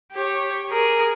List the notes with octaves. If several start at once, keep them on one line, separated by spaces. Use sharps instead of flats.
G4 C#5
G#4 A#4